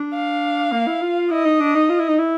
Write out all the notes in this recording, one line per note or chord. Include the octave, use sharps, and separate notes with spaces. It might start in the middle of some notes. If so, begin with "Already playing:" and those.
Already playing: D4
F5
A#3
E4
F4
E4 D#5
D#4
D4
D#4
F4
E4
D#4
E4